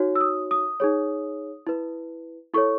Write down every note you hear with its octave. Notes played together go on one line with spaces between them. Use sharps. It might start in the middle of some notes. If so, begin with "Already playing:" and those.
Already playing: D#4 F#4 C#5
E6
D#6
D#6
D#4 G#4 C#5
E4 B4
E4 A4 C#5 C#6